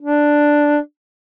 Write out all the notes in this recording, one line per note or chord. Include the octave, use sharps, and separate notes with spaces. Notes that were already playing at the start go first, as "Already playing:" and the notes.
D4